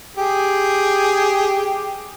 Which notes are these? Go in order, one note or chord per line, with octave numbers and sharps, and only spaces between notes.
G4 G#4